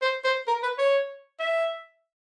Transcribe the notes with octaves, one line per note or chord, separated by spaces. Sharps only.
C5
C5
A#4
B4
C#5
E5